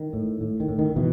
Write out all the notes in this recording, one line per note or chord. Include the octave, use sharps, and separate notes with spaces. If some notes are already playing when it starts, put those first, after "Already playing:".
Already playing: D#3
A2
A2
D#3
A2
D#3
B2 E3